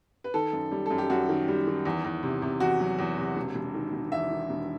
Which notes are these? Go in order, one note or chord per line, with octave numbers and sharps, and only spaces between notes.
B4
D#3 A4
F#2
G3
F#2 A4
G4
F#2 F#4
D#3
G3
D#3
E2
E2
C3
C3
E2 F#4
F#3
E2
C3
E1
E1
D#3
E1
E2 E5
D#3
E1